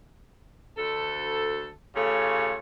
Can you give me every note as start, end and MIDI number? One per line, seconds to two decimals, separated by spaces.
0.78 1.71 38
0.78 1.71 69
1.96 2.57 49
1.96 2.57 57
1.96 2.57 65
1.96 2.57 67
1.96 2.57 73